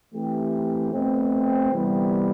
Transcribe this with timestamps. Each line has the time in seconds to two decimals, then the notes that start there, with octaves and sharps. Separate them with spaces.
0.13 E3 A3 C4 G4
0.92 B2 A3 C4
1.71 C3 E3 G3 B3